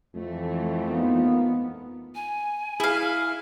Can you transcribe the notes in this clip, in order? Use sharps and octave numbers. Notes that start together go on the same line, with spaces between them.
F2 E3 A3
A#3 B3 D#4 F4
G#5
E4 G#4 F5